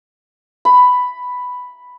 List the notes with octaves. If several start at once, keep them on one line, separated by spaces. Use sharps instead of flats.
B5